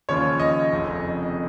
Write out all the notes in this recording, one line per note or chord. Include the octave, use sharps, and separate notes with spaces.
D#2 C#3 F3 C#5
D#5
F1 F2 C#3